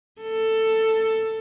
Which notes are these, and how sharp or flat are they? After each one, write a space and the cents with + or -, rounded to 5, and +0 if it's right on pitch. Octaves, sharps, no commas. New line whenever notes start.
A4 +15